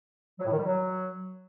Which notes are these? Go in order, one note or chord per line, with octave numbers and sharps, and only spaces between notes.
F#3
A2
D#3
G3
F#3